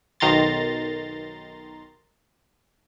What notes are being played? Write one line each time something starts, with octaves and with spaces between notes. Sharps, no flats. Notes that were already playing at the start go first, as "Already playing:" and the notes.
B1 D#3 A#5 C6 A6